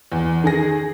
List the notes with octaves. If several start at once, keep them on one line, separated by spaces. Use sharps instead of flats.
E2
D#3 G#4 A#6